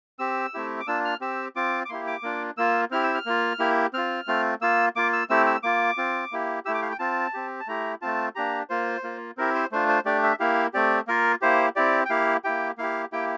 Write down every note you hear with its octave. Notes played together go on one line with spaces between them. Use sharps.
C4 G4 E6
A3 C4 E4 G4
D6
A#3 D4 F4 E6
F6
C4 G4 E6
C4 F4 D6
D6
A#3 E4 G4 C6
D6
A#3 D4 F4
A#3 F4 E6
C4 E4 G4 F6
E6
F6
A#3 F4
A#3 E4 G4
C4 F4 F6
A3 C4 F4
A#3 F4 E6
A#3 F4 D6
E6
A3 C4 E4 G4 E6
E6
A#3 F4 D6
C4 F4
A#3 E4 G4
A3 E4 G4 E6
D6
F5
G5
C4 F4 A5
C4 G4
A5
A3 E4 G4 A#5
A3 C4 F4 A5
A#3 D4 G4 A#5
A#3 F4 C5
A#3 F4
C4 E4 G4 A#4
C5
A3 D4 F4 C5
C5
A3 D4 G4 D5
E5
A#3 E4 G4 F5
A3 C4 G4 D5
A#3 F4 A#4
A#3 E4 G4 C5
C4 E4 G4 D5
G5
A#3 E4 G4 F5
A#3 E4 G4 G5
A#3 E4 G4 F5
A#3 E4 G4 G5